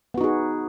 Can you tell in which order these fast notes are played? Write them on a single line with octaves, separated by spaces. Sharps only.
B3 F#4 D#4 G#4